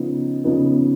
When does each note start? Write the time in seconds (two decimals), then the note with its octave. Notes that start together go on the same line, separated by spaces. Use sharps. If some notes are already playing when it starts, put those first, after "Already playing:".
Already playing: C#3 F3 B3 D#4
0.44 C#3 F3 B3 D#4